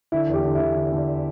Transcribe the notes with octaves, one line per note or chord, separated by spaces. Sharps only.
D3 E4
E2
G4
D3
D3 E4
D3
D3